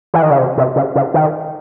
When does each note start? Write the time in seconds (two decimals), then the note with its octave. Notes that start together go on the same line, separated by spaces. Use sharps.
0.14 E3
0.22 D#3
0.30 C#3
0.38 C3
0.58 C3
0.76 C#3
0.96 C#3
1.14 D#3